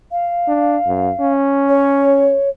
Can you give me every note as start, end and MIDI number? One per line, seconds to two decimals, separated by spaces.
0.11 1.32 77
0.48 0.77 62
0.87 1.10 42
1.20 2.35 61
1.69 2.49 73